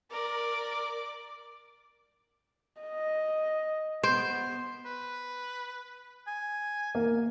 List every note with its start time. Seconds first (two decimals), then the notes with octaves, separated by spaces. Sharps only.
0.12 A#4 D5
2.81 D#5
4.03 B3 C5
4.86 B4
6.27 G#5
6.95 A#3